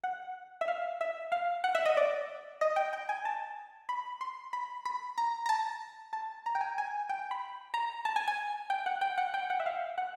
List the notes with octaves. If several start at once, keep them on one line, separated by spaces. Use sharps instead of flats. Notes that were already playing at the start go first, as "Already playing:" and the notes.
F#5
E5
F5
E5
F5
F#5
E5
D#5
D5
D#5
G5
G5
G#5
A5
B5
C6
B5
B5
A#5
A#5
A5
A5
A#5
G5
G#5
G#5
G5
B5
A#5
A5
G#5
G#5
G5
F#5
G5
F#5
G5
F#5
E5
F5
F#5